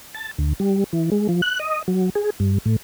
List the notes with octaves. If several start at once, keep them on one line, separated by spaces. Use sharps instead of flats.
A5
D2
G3
E3
G#3
F3
F#6
D#5
F#3
G#4
G2
A2